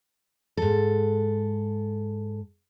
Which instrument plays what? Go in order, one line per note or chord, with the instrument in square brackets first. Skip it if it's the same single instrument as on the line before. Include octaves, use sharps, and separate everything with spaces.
[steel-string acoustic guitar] G#2 A4